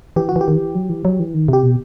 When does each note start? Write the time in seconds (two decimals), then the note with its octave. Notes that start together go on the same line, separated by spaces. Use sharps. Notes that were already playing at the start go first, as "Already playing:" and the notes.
0.16 E3 G4
0.29 F#4
0.36 E3
0.41 G4
0.48 D#3
0.56 E3
0.75 F#3
0.90 E3
1.05 F#3
1.20 E3
1.34 D#3
1.48 C3 G4
1.63 B2